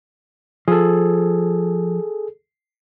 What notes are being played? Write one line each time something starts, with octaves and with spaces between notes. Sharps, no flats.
F3 G#4 A4